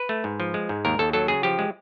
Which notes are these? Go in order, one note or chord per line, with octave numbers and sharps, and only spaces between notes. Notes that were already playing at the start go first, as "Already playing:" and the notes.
Already playing: B4
A3
G#2
F3
G#3
G#2
D#2 A#4
D#2 A4
F#3 A4
C#3 G#4
F3 G4
G#3